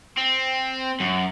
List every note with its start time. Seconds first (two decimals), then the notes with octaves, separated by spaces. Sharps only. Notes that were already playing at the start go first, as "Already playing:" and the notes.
0.17 C4
1.00 F#2